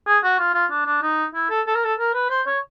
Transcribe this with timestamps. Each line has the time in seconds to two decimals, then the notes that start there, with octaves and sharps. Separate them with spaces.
0.07 G#4
0.24 F#4
0.39 F4
0.54 F4
0.71 D4
0.86 D4
1.03 D#4
1.34 E4
1.50 A4
1.67 A4
1.75 A#4
1.84 A4
1.99 A#4
2.14 B4
2.30 C5
2.47 C#5